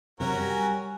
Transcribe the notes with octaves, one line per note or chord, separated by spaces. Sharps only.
F#2 C3 C#4 F#4 A#4
G3
G#5